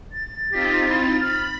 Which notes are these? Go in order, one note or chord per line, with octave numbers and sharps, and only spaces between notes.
A6
C4 D#4 F4 G4
E4
B5 F6